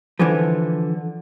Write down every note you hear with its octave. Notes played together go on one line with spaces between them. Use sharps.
D3 E3 F3